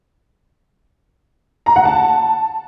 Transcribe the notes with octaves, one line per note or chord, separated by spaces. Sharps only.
A#5
F#5
A5